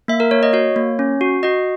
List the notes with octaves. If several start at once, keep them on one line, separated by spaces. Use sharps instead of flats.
A#3 E5
A#4
A#3 C#5
D#5
F#4 C#5
A#3
C#4
F#4
F#4 D#5